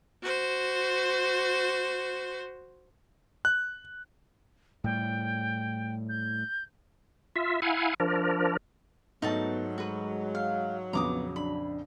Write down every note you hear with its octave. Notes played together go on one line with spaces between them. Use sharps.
F#4 C5
F#6
A2 G3 G5
G6
F4 E5
E4 F5 F#5 G#5
F3 D4 A#4
G#2 F#3 A3 B3 D#4 F#4 A5
G#3 F#4 B4
F5
A#1 F2 C#3 B3 A#5 D6 D#6
D4 B5